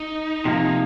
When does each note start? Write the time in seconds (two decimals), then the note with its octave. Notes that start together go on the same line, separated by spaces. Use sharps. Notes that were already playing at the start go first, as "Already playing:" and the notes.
Already playing: D#4
0.45 C3 F3 A#3